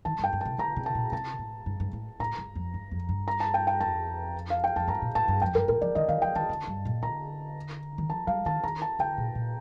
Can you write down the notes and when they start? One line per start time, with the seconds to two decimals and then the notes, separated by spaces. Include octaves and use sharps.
0.05 D#3 A5
0.19 G2 G5
0.33 G2
0.41 C3 A5
0.58 D3 A#5
0.76 C3
0.86 A5
0.95 A#2
1.12 C3 A5
1.39 A2
1.66 G2
1.80 G2
1.93 A2
2.20 A2 A#5
2.38 G2
2.55 F2
2.74 G2
2.91 F2
3.09 G2
3.28 A#5
3.40 A5
3.54 G5
3.67 G5
3.80 F2 A5
4.50 F5
4.64 G5
4.76 F2 A5
4.88 G2 A#5
5.02 A#2
5.15 A2 A5
5.28 G2
5.42 F2 G5
5.55 G2 A#4
5.68 A2 A#4
5.81 F3 D5
5.95 D#3 D#5
6.09 D#3 F5
6.22 F3 G5
6.35 D#3 A5
6.49 D3
6.67 G2
6.85 A#2
7.02 D3 A#5
7.98 D#3
8.10 F3 A5
8.27 G3 F5
8.46 D#3 A5
8.64 D#3 A#5
8.82 A5
8.99 D3 G5
9.18 A#2
9.35 A#2